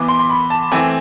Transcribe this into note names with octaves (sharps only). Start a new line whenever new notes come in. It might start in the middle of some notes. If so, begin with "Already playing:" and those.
Already playing: E3 B3 D6
C6
C6
B5
A5
E3 A3 C4 G#5